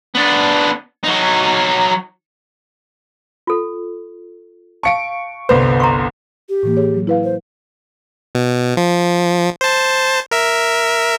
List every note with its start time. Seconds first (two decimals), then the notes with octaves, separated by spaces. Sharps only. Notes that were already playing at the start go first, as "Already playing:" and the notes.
0.15 B3 D4
1.04 F#3 D#4
3.47 F4 A4
4.83 F5 A5 C#6 C#7 D7
5.49 G1 C2 B4 C5
5.80 A#5 C6 C#6
6.49 G4
6.63 A2 E3 A#3
6.77 G#4 C#5
6.94 F#3
7.07 E4 B4 F5
7.24 C5
8.35 B2
8.77 F3
9.61 C5 A5
10.31 A#4 E5